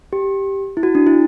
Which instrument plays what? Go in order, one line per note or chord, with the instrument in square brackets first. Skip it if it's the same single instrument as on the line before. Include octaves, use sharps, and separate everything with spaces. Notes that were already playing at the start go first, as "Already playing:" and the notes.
[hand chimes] G4
E4
F#4
D4
E4